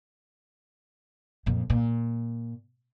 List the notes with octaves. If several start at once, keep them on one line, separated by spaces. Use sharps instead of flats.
F2 A#2
A#2